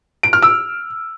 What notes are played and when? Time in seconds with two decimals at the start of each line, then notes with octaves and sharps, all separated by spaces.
0.23 D7
0.33 F6
0.42 E6